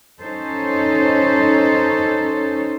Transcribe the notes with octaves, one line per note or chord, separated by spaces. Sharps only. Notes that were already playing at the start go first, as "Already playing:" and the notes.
C#4 D#4 A4 C5 C#5